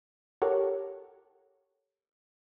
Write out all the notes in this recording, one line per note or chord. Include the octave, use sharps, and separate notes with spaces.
G4 A4 A#4 C#5 F#5